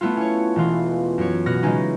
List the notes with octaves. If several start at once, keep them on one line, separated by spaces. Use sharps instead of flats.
A3 B3 E4 F4
C#4 C#5
E1 E3 F4
F#2 C#5
B2 F#4 F6 A#6
C#3 E3 G#3 C#4 D#4